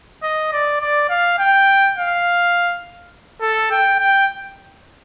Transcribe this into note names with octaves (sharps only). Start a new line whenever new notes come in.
D#5
D5
D5
F5
G5
F5
A4
G5
G5